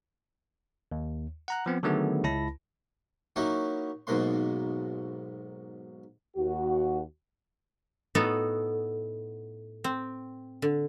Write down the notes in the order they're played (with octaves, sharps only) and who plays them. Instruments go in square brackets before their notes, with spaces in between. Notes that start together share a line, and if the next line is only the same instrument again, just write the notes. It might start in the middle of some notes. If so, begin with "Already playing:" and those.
[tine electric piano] D#2
F#5 A#5 F#6
F3 B3 C4
D3 D#3 F#3 A3 B3 G#4
C#2 E4 A5 B5 A#6
[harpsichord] F#3 A#3 C#4 D#4 E4
B1 G#2 B2 A#3 C6
[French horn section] D#2 F#4
[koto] A2 B3 D#4 F#4 A4
C4
D3